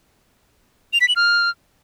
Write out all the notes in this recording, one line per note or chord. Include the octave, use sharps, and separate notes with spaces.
F7
B6
F#7
F6